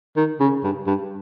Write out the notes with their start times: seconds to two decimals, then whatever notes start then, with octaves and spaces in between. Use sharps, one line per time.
0.17 D#3
0.40 C#3
0.64 G2
0.87 G2